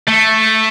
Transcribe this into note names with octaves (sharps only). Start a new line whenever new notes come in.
A3